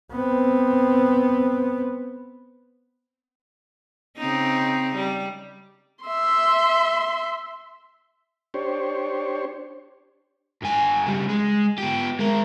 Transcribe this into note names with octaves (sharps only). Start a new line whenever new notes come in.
B3 C4
C#3 C4 D#4
G3
E5 C6
D4 G4 C5 C#5
G2 G#5
C#3 G3
G#3
B3 G4
G#3 A#4